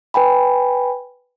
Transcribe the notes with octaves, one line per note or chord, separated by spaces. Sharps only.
B4 G5 G#5 B5